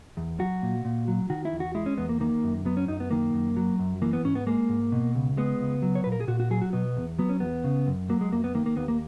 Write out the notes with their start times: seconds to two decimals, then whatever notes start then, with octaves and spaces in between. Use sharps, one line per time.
0.17 E2
0.39 F#3 F#4
0.62 A#2
0.85 A#2
1.08 F#3
1.30 D#3 F#4
1.45 E4
1.53 E2
1.60 F#4
1.75 G#3 E4
1.86 C#4
1.98 E2 B3
2.09 A#3
2.20 D#3 A#3
2.44 F#2
2.65 F#3 B3
2.77 C#4
2.88 F#2 D#4
3.00 B3
3.11 D#3 A#3
3.34 F#2
3.56 F#3
3.79 F#2
4.02 E3 A#3
4.13 B3
4.24 G#2 C#4
4.35 B3
4.47 G#3 A#3
4.69 G#2
4.92 B2
5.15 C#2
5.37 G#3 B3
5.61 C#2
5.82 F#3
5.95 C#5
6.04 A#2 B4
6.12 A#4
6.20 G#4
6.28 A#2 F#4
6.40 F#4
6.50 F#3 G#4
6.61 F#4
6.73 B2 B3
6.97 E2
7.19 F#3 B3
7.29 C#4
7.40 E2 B3
7.64 C#3
7.87 F#2
8.09 F#3 A#3
8.21 G#3
8.32 F#2 A#3
8.44 B3
8.54 D#3 A#3
8.66 A#3
8.77 D#2 B3
8.88 A#3